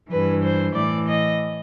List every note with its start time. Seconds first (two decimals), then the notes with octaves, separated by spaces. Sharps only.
0.11 G2 E3 B4
0.43 C5
0.75 A2 E3 D5
1.07 D#5